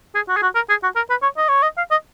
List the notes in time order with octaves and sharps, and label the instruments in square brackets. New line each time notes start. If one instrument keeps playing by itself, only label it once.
[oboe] G#4
F#4
G#4
F#4
A#4
G#4
F#4
A#4
B4
C#5
D#5
C#5
D#5
F5
D#5